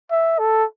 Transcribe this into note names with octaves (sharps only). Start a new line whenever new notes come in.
E5
A4